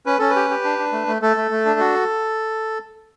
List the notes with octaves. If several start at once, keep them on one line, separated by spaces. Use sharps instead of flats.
C#4 B4
C#4 A4
B4
G4
G4
D4
D4
A3
A3
A3 A4
A3
A3
D4
F#4